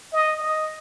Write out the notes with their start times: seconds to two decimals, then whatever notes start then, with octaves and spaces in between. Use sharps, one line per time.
0.13 D#5
0.41 D#5